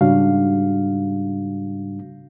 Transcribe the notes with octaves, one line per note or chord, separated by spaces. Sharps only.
G#2 C#3 G3 D4 F#4 F5